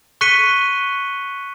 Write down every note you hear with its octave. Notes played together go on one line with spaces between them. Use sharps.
C#6 F#6 B6 C#7 D#7 G7